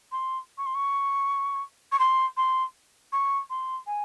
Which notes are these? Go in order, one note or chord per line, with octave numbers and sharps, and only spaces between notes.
C6
C#6
C6
C#6
C#6
C6
C6
C#6
C6
G#5